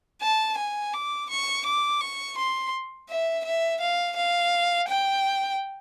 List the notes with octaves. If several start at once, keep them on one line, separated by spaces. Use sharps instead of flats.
A5
G#5
D6
C#6
D6
C#6
C6
E5
E5
F5
F5
G5